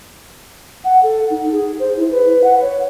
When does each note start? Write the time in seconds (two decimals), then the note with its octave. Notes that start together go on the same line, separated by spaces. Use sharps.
0.84 F#5
1.03 A4
1.30 D#4
1.52 G#4
1.79 C5
1.97 E4
2.12 B4
2.44 F#5
2.61 C#5